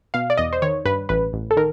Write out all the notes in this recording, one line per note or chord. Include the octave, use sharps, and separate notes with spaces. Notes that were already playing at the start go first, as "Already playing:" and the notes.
B2 F5
D5
E2 D#5
C5
D#3 C#5
G2 B4
A1 B4
A1
A4
D#3 A#4